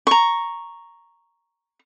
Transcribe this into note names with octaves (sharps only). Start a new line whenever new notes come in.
A#5 C#6